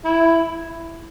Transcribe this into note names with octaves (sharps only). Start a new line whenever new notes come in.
E4